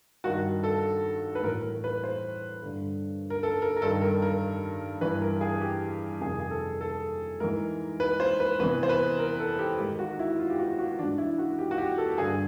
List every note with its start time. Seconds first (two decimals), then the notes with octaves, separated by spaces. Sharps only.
0.24 G2 D#3 F#4
0.63 A4
1.35 B4
1.43 A2 E3 A#4
1.63 A#4
1.84 B4
2.03 C5
2.63 G2 D3
3.30 A#4
3.43 A4
3.62 A#4
3.76 A#4
3.82 G2 D#3 A4
4.02 A#4
4.22 A#4
5.01 G2 E3 B4
5.22 A#4
5.41 G#4
5.61 G4
6.21 F2 C3 D#3 G#4
6.40 G#4
6.51 A4
6.81 A4
7.40 G#2 E3 A#4
8.00 B4
8.20 C5
8.40 B4
8.59 E2 C3 E3 B4
8.83 C5
8.89 B4
9.19 A#4
9.40 A4
9.59 G4
9.78 G#2 D#3 G4
9.99 F#4
10.19 E4
10.39 F4
10.50 G4
10.59 F#4
10.79 F#4
10.99 G#2 E3 D4
11.18 E4
11.38 F#4
11.59 G4
11.71 F#4
11.78 G4
11.98 A4
12.18 G2 D3 G#4